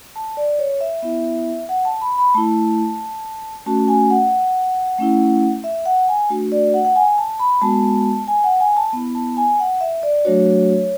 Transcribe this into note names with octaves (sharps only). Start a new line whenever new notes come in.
A5
D5
C#5
E5
B3 E4 E5
F#5
A5
B5
B5
A3 E4 A5
A3 C#4 F#4 A5
G#5
F#5
A3 C#4 E4
E5
F#5
G#5
A3 D4 F#4
D5
F#5
F#5
G#5
A5
B5
G#3 B3 F#4 A5
G#5
F#5
G#5
A5
B3 E4
A5
G#5
F#5
E5
D5
F#3 A3 D4 F#4 C#5